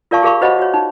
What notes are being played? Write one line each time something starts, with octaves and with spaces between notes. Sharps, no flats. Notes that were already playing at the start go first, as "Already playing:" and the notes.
F4 A#4 D5 F5 A5 C#6
G4 G#4 A#4 F5 B5 C#6
F#4 C5 C#5 D#5 F#5 B5
F#4 C#5
D#4